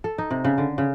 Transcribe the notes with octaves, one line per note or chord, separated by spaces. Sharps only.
A4
D#4
C3
C#3
D3
C#3